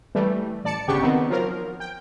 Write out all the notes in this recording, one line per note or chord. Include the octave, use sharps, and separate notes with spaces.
E3 G3 A3
A1 D5 A5 C#7
G1 C#3 B3 D4 G4 C#6
D#3 B3 C4 D#4
F3 F#3 A#4
G5